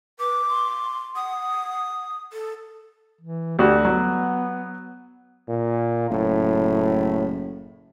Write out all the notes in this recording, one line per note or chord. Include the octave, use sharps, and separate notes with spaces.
B4 D6
C6
F#5 D#6
A4
E3
D2 F#4 G4
F#3 B3
A#2
F#1 A2